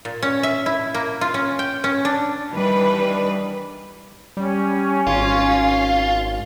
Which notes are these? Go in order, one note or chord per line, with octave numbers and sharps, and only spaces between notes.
A#2
C#4
E5
E4
A#3
F4
C#4
G5
C#4
D4
D#3 E3 G3 D4 B4
G3 C#4
G#1 F4